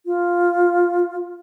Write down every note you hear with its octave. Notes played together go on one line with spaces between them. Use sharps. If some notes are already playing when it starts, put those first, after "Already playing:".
F4